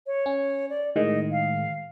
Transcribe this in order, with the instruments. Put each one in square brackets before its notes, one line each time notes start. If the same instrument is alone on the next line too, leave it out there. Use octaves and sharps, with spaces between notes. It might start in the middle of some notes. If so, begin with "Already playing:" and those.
[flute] C#5
[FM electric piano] C#4
[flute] D5
[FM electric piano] A2 D#3 G#3 [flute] D#5
[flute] F5